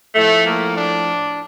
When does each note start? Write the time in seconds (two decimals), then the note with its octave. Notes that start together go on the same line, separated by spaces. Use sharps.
0.14 A2 F3 A3
0.45 A#3
0.75 D4